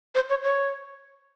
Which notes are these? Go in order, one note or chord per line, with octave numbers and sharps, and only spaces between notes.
C5
C#5
C#5